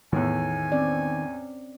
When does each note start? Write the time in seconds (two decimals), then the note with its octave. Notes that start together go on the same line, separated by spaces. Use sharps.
0.13 E2 A2 D#3 B3 G#5
0.72 C4 C#4 D5